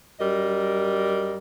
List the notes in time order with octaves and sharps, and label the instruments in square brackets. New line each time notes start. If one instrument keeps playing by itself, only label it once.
[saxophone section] F#2 G3 A#4 D#5